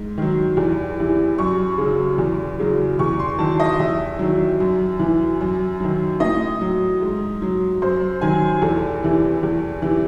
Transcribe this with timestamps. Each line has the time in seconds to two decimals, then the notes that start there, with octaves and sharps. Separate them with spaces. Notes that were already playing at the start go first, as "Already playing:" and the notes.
Already playing: G#2
0.18 D#3 F#3
0.57 E2
0.98 C3 E3
1.38 F#2 C#6
1.78 C#3 F#3
2.18 E2
2.59 C#3 F#3
2.99 E2 C#6
3.19 C6
3.39 D#3 F#3 A5
3.60 D#5
3.79 E2 E5
4.19 D#3 F#3
4.60 F#2
4.99 E3
5.41 F#2
5.80 D#3 F#3
6.20 A2 D#5
6.61 F#3
7.02 G#2
7.42 F#3
7.82 F#2 C5
8.21 D#3 F#3 G#5
8.61 E2 A4
9.03 C3 E3
9.43 E2
9.82 C3 E3